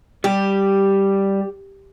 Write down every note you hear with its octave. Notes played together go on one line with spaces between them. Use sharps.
G3 G4